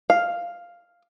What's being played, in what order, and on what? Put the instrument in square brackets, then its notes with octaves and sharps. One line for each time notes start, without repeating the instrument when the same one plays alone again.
[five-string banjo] F5